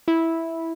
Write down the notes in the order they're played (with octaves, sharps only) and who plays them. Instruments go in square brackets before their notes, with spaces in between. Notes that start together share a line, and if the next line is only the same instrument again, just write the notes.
[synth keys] E4